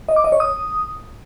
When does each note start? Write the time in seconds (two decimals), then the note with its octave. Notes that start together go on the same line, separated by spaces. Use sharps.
0.09 D#5
0.16 D6
0.24 D#5
0.32 C#5
0.40 D#6